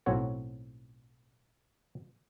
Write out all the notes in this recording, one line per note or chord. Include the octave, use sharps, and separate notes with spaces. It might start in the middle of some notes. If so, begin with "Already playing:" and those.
B1 A2 C4 F#4 C#5 F#5